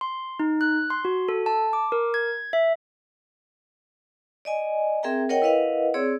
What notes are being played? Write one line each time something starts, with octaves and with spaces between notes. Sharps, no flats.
C6
D#4
F#6
C6
F#4
A4
A5
D6
A#4
G#6
E5
D5 D#5 G#5
C4 G#4 A#4 E5 G5 A#5
A#4 C#5 D#5 F#5 G5
E4 A#4 B4 D#5 F5 F#5
C4 G#4 C#5 D5 E6